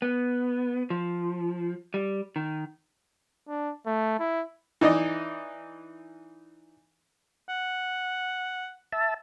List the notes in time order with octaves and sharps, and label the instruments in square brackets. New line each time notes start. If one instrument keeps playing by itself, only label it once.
[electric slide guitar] B3
F3
G3
D#3
[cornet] D4
A3
E4
[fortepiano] E3 D#4 D5 D#5
[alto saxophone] F#5
[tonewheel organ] E5 A5